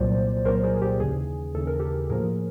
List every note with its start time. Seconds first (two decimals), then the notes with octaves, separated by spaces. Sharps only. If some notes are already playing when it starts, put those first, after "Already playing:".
Already playing: C2 A#2 F#3 A#3 C5 D5
0.45 C2 A#2 F#3 A#3 A#4 C5
0.64 G#4 A#4
0.76 G#4
0.82 G4
1.00 D#2 C#3 E3 G#4
1.54 D#2 C#3 E3 A4
1.67 A#4
1.79 G4 A4
2.10 A2 F3 A#3 G#4 A#4